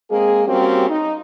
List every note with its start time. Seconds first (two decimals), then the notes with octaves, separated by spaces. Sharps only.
0.10 G#3 A#3 C4 G#4
0.47 G3 A#3 C4 C#4 F#4 G4
0.89 D#4